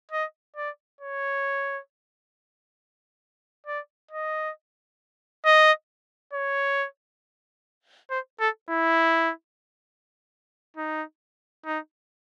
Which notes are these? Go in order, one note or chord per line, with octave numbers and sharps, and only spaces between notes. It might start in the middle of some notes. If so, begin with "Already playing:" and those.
D#5
D5
C#5
D5
D#5
D#5
C#5
C5
A4
E4
D#4
D#4